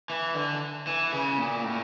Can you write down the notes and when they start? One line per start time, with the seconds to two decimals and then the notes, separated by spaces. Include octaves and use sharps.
0.10 E3
0.35 D3
0.87 E3
1.12 C#3
1.38 A#2
1.64 A2